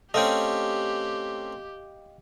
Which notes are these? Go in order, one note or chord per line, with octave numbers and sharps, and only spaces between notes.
A3 C4 C#4 G4 D#5 F5 G5